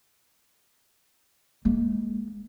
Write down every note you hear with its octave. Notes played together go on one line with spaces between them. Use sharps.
G#3 A#3